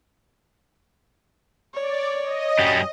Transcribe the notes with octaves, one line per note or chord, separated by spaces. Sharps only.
C#5 D5
D#5
F#2 G3